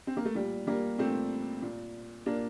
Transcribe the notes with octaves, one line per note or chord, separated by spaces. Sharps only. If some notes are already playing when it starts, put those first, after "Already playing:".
C4
A#3
A3
A#2 G3
G3 A#3
A#2 A3 C4
A#2
A#2 A#3 D4